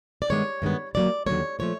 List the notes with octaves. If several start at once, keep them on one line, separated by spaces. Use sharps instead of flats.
D5
G2 D#3 G#3 B3 C#5
G2 D#3 G#3 B3
D#2 D3 F#3 A#3 D5
D#2 D3 F#3 A#3 C#5
A#2 F3 A3 C#5